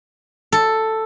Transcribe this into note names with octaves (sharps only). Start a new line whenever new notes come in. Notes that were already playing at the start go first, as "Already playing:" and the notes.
A4